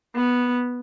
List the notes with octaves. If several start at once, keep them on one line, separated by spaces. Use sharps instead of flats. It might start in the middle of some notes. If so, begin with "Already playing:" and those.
B3